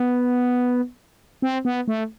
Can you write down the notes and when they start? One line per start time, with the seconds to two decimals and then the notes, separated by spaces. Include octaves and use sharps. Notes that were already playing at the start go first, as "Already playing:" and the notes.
Already playing: B3
1.42 C4
1.65 B3
1.88 A3